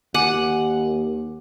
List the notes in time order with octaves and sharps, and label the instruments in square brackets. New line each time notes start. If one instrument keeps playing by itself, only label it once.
[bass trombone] D#2 [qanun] F#5 [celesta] G#5 D6 D#7